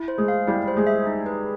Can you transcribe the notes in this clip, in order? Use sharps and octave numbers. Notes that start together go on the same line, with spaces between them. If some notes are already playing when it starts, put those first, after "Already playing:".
Already playing: E4
C5
G#3 G#4
F5
G3 E4 G4
C5
G#3 G#4
E5
D#4
B4